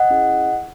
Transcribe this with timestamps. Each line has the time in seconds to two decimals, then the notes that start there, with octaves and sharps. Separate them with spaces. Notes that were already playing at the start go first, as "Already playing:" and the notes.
Already playing: D#5 F#5
0.10 C#4 E4 G#4